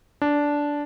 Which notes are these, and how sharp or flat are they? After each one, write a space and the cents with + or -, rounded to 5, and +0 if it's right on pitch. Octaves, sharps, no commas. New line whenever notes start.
D4 -10